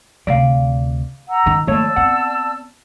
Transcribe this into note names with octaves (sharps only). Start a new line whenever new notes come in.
D2 C3 D5 F5
F#5 A#5 E6
D#3 D#4
D#3 F3 A3 A#3 C#5 D5 A5 E6
B3 C4 F#5